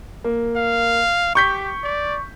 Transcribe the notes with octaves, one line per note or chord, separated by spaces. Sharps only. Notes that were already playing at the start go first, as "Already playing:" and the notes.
A#3
F5
G4 C#6 G6 B6
D5